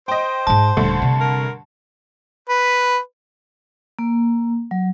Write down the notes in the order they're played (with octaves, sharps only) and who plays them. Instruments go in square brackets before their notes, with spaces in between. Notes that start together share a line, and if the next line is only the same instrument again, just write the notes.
[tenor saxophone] C5 [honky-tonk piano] D#5 G5
[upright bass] G#2 G#3 [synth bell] A5
[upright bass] D#1 [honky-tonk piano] G2 D3 A3
[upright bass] C3
[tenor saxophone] A#4
[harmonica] B4
[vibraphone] A#3
F#3